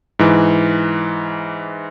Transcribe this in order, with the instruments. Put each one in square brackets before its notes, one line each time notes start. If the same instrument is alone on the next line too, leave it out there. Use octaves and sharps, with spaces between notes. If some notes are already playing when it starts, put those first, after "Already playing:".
[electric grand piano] G#2 E3